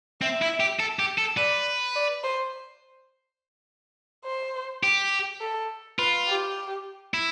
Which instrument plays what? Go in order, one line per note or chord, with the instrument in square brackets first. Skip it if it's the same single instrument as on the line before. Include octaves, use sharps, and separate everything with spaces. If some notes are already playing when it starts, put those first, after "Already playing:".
[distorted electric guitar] C4 [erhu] E5
[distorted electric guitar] E4
G4
A4
G4
A4
[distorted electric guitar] B4 [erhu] D5
[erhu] D5
C5
C5
[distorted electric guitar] G4
[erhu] A4
[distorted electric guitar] F4 [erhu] B4
[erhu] G4
[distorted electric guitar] E4